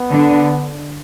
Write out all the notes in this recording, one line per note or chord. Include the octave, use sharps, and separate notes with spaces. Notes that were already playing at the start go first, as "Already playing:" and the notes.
Already playing: B3
D3